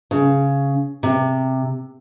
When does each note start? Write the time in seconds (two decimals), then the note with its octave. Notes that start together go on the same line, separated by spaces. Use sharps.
0.11 C#3
1.03 C3